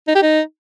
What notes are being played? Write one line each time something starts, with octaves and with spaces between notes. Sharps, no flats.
D#4
G4
D#4